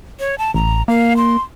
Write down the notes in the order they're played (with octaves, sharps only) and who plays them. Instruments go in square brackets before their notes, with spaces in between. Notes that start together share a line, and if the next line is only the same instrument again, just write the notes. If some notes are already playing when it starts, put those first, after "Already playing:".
[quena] C#5
A5
[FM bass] A1 [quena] A#5
[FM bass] A#3 [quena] F5
[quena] C6